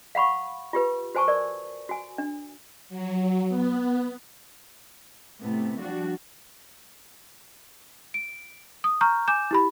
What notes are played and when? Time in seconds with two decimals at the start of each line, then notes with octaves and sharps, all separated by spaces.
0.15 F5 F#5 B5 C#6
0.73 F4 G4 B4
1.15 F#4 C5 G#5 A5 C#6
1.28 A#4 D5
1.89 F#4 G#5
2.18 D4
2.89 F#3
3.49 B3
5.41 A2 C3 A3 B3
5.79 F3 G3 D4 F#4
8.14 D7
8.84 D#6
9.01 A#5 C#6 F6 G6
9.28 G#5 D6 G6 E7
9.51 E4 G4 B5